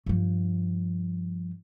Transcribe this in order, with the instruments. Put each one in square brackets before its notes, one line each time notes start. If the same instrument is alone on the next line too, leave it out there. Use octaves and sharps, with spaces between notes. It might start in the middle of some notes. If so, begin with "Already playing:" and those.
[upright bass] G2 F3